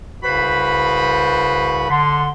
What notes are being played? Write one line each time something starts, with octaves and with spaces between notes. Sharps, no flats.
C2 C#3 F#4 B4 C5 B5
D3 C6